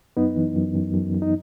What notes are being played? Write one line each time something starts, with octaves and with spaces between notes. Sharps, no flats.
F#2 B3 D#4
E3
F#2
F#2
F#2
F#2
D#4